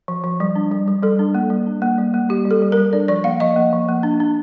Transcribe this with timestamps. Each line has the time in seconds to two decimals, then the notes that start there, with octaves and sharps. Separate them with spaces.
0.08 F3
0.24 F3
0.40 G3
0.55 D4
0.71 G3
0.88 G3
1.03 G3 A4
1.19 D4
1.35 A#3
1.50 G3
1.67 D4
1.82 A#3
1.98 G3
2.14 A#3
2.29 G3 G4
2.45 G3
2.51 A4
2.62 G3
2.72 G3 A#4
2.93 D4 D5
3.08 F3 D5
3.24 A#3 F5
3.40 F3 D#5
3.56 A#3
3.73 F3
3.89 A#3
4.03 D4
4.20 D4